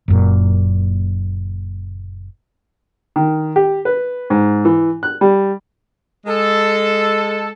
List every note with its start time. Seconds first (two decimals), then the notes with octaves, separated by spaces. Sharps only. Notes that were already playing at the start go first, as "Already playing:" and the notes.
0.08 F#1 F#2 A#2
3.16 D#3
3.56 G4
3.85 B4
4.30 G#2
4.65 E3
5.03 F#6
5.21 G3
6.26 G#3 A4